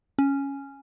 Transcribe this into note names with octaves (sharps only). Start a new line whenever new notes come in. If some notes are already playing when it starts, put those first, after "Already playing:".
C#4